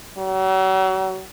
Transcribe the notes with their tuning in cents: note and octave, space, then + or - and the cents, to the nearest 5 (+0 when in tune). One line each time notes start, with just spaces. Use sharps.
F#3 +40